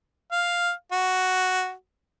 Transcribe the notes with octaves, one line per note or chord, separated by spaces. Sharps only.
F5
F#4